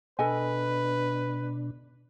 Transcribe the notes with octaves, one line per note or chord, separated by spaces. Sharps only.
B2 D4 A4 B4 D#5 G#5